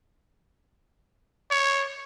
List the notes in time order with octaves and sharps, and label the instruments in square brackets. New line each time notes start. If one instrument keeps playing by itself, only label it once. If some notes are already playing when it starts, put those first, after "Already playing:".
[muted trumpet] C#5